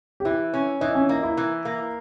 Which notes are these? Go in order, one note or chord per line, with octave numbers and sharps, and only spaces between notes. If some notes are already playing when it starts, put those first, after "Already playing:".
G4
E3 E4
C#4
E3 D#4
C#4
A#3 D#4
E4
E3
A#3